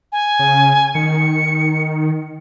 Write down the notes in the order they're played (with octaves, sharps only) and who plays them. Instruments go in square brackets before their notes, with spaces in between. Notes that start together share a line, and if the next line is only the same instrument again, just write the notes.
[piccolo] G#5
[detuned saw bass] C#3
[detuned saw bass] D#3 [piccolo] C#7